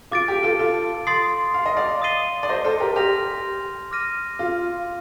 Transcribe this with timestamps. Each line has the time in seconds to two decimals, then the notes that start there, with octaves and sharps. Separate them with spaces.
0.11 F4 D6 A6 D7
0.28 G4
0.43 F4 A4
0.59 F4 A4
1.07 C6 D#6 A6 C7
1.54 F5
1.66 D#5
1.77 D5 F5
2.02 D#6 A6 C7 D#7 G7
2.43 D5
2.49 C5 D#5
2.64 A4 C5
2.80 G4 A#4
2.96 G4 C6 F6 A#6 F7
3.91 D6 F6 A#6 D#7
4.39 F4